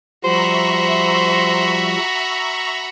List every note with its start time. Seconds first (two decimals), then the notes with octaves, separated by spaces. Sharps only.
0.24 F3 G3 F#4 C5 E5 A#5 B5 C#6